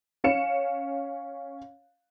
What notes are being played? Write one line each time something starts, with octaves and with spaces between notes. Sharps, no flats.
C#4 F5 C#7 E7